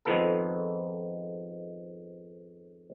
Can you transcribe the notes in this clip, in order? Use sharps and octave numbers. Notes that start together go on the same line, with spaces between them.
F2 G#2 D#3 F3 B3 A4